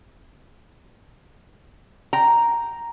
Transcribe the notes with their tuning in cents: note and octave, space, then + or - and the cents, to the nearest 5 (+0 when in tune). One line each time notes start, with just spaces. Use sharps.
G5 -10 A#5 +0